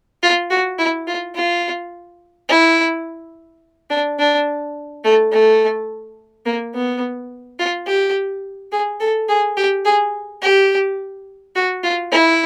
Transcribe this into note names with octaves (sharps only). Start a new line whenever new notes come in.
F4
F#4
E4
F4
F4
E4
D4
D4
A3
A3
A#3
B3
F4
G4
G#4
A4
G#4
G4
G#4
G4
F#4
F4
E4